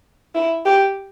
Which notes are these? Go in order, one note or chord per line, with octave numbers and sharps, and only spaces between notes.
E4
G4